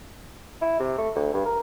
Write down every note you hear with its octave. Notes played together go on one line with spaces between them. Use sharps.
E4
C3
A3
D2
G2
A#4